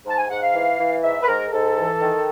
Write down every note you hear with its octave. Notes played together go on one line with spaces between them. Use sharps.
G#2 A5
G#5
G#2 F#5
F5
E3
E3
G#2 E5
B4
G#2 A#4
G#2 A4
E3
D#3